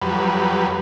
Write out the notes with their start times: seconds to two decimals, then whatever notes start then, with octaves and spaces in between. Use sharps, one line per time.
0.02 F2 F#3 G3 B4